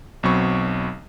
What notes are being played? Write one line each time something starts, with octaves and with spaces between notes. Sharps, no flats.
B1 B2 F#3 C4 B5 C#6